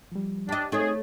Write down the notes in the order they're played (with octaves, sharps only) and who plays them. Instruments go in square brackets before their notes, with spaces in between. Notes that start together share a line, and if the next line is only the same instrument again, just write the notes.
[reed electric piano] F3 G3
[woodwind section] D4 [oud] G4 D#5
[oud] A3 C#5 [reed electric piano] C4 D#4 [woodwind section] G#4